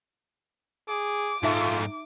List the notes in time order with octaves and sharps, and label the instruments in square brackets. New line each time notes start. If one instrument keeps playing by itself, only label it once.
[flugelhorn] G#4 [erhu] D6
[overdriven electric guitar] G#2 A3 [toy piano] D#4 E5 A#5 [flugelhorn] F4